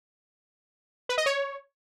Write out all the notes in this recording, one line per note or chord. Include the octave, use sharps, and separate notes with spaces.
B4
D#5
C#5